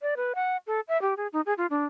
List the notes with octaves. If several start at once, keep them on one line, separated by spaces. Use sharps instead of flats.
D5
B4
F#5
A4
E5
G4
G#4
D#4
G#4
F4
D4